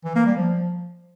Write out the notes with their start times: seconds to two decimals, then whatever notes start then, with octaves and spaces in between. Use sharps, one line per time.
0.05 E3
0.15 A#3
0.26 G3
0.37 F3